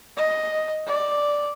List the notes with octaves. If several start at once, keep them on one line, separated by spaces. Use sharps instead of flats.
D#5
D5